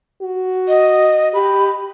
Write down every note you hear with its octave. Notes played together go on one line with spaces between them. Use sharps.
F#4
D#5
G4 B5